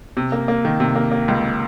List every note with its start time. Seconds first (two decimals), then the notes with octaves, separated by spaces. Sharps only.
0.17 C3
0.32 A#3
0.48 A#3
0.65 D#3
0.80 C3
0.96 A#3
1.12 A#3
1.28 C#2